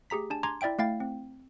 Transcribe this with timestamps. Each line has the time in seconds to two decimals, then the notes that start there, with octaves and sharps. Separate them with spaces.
0.10 A3 G4 G#4 A#5 B6
0.30 D4 G#5 A5
0.43 G#5 A#5 C6 D6 G#6
0.61 E4 D5 E5 G5 D7
0.79 A3 E4 F5 G5 A6
1.00 C4